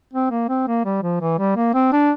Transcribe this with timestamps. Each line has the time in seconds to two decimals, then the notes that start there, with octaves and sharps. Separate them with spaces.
0.13 C4
0.30 A#3
0.49 C4
0.68 A#3
0.85 G3
1.02 F3
1.21 E3
1.39 G3
1.56 A#3
1.74 C4
1.92 D4